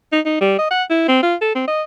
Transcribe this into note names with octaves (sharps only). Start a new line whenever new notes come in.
D#4
D#4
G3
D#5
F#5
E4
C4
F4
A4
C4
D#5